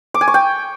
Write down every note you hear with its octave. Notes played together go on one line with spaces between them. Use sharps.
D6
G#5
C#6
G5